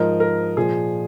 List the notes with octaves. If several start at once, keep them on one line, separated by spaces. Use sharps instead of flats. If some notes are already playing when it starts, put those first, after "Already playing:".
Already playing: G#2 F3 A#4 D#5
A#4
A#2 F3 G#4